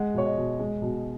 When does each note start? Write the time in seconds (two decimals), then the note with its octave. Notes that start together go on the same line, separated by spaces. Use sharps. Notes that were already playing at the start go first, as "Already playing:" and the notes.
Already playing: G#3 F#5
0.14 B2 C#5
0.26 D#5
0.38 B2
0.59 G#3
0.82 B2